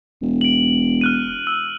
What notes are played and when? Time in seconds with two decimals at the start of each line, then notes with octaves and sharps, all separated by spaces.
0.22 E1
0.41 D7 F#7
1.01 F6 F#6 D#7
1.47 E6